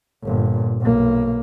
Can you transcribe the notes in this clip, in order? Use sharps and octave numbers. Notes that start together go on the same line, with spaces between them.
G1 A#2
B1 A#3